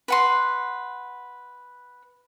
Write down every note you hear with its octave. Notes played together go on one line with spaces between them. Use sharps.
B4 F#5 C6